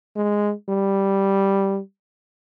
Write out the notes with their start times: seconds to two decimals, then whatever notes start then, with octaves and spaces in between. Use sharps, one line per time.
0.16 G#3
0.69 G3